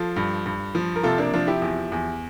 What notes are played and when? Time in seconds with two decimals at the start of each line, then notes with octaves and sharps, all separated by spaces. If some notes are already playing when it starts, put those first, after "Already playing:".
Already playing: F3 F4 A4
0.16 G2
0.46 G2
0.75 F3
0.96 A#4
1.03 C3 F4 A4
1.18 A#3 D4
1.34 F3 D4 F4
1.47 E4 G4
1.62 E2
1.92 E2